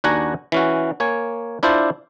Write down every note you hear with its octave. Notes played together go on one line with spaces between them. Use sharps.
D#2 D4 F#4 F#5 G#5 A#5
E3 C#4 F#4
A#3 C#5 G#5
D4 E4 F4 C5 D5